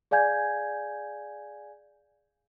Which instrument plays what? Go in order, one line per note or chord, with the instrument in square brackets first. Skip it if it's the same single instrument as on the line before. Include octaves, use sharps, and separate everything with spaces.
[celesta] G#4 D5 F5 G#5 G6 G#6